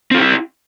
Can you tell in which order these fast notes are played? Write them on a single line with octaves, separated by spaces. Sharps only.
C4 F4 G4 E4